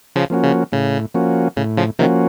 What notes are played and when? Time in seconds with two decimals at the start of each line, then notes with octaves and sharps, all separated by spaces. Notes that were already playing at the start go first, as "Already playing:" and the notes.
0.16 C#3 F3
0.30 F3 A#3 C#4 F#4
0.43 C#3
0.72 A2 C#3
1.14 F3 A#3 C#4 F#4
1.57 A2 C#3
1.77 C#3 F3
1.99 C3 D#3 F3 A#3 C#4 F#4